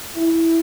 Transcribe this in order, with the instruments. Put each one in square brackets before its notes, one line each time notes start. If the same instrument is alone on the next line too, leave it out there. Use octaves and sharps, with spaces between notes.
[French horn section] E4